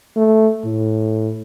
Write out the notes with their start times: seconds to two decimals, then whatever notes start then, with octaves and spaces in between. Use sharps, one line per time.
0.16 A3
0.65 A2